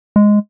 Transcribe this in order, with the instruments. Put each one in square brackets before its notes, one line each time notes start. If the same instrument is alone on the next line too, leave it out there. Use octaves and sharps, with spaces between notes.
[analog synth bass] G#3